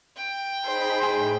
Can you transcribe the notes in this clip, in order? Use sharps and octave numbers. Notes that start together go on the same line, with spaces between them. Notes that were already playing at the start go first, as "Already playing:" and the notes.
G5
D#4 G#4 C5 B5
A2 G#4